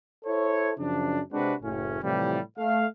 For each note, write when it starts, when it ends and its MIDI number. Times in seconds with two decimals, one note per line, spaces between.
0.25 0.71 64
0.25 0.71 69
0.25 0.71 72
0.25 0.71 73
0.78 1.20 42
0.78 1.20 49
0.78 1.20 53
0.78 1.20 62
1.33 1.53 48
1.33 1.53 56
1.33 1.53 60
1.33 1.53 62
1.33 1.53 66
1.33 1.53 71
1.63 1.99 30
1.63 1.99 45
1.63 1.99 61
2.02 2.39 45
2.02 2.39 48
2.02 2.39 52
2.02 2.39 53
2.02 2.39 55
2.57 2.85 57
2.57 2.85 77